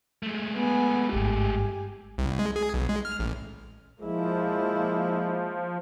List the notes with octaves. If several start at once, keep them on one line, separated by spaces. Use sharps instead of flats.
G#3 A3
B3 G#5
G#1 G2 G4 G#5
C2
G#3
G#4
B1
G#3
F6
A1
F3 G#3 A#3 E4